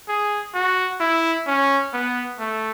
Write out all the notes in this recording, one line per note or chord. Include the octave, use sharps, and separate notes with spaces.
G#4
F#4
E4
C#4
B3
A3